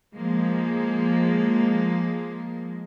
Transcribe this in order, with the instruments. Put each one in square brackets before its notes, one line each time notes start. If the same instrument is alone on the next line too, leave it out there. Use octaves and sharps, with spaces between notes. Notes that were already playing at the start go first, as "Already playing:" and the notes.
[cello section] F3 G#3 A#3